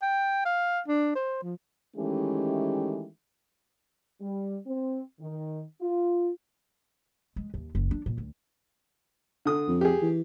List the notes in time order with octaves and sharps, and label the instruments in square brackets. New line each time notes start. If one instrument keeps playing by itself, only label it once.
[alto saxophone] G5
F5
D4
C5
F3
[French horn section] D#3 E3 G#3 A3 C#4 G4
G3
C4
D#3
F4
[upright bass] G#3
D#2
F#1
D4
A#2
D2
[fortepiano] D3 D#6
[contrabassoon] F2
[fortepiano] G4 G#4
[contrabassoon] E3